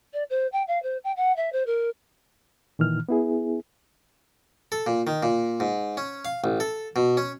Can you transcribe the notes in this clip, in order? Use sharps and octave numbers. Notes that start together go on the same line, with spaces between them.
D5
C5
G5
F5
C5
G5
F#5
E5
C5
A#4
A#2 D#3 E3 F6
B3 E4 G#4
A4
A#2
D#3
A#2
G#2
C#4
F5
A1
A4
B2
C#4